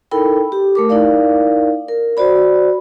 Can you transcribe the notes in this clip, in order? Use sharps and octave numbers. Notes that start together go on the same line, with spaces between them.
D#4 E4 A4 A#4 G5 B5
G4
A3 A#4 D6
D#4 E4 A#4 D5 F5
A#4
F#4 C5 D5 B5